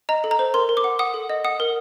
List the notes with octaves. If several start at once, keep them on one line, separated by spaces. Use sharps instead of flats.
D#5 A#5
A4
A#5
C5
A#4 C6
A#4
D6
F#5
F#5 D#6
A4
D#5
F#5 D#6
A#4